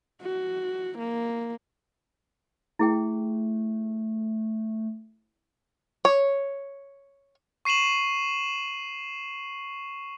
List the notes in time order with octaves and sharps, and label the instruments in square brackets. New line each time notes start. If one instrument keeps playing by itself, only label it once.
[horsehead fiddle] F#4
A#3
[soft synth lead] A3 [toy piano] E4 G#4 G5
[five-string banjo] C#5
[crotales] C#6 C7 D#7 E7 F#7